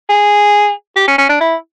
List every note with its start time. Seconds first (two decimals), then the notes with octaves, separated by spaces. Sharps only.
0.09 G#4
0.96 G4
1.08 C#4
1.18 C#4
1.29 D4
1.40 E4